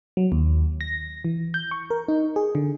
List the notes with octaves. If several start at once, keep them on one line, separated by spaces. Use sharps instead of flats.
F#3
D#2
A#6
E3
G6
C#6
A#4
D#4
G#4
D3